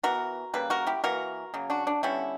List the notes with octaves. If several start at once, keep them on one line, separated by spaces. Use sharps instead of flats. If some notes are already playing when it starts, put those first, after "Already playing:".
E3 B3 F#4 A#4
C#3 G3 A#3 B4
F#4 A#4
E4 G4
E3 A#3 F#4 A#4
C#3 F#3 A#3
D4 F#4
D4
D3 G3 B3 C#4 E4